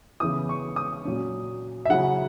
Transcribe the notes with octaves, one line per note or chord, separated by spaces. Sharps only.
C#3 E3 B3 E4 D#6
C#6
D#6
A#2 F#3 C#4
E5
C#3 F#3 C#4 E4 F#5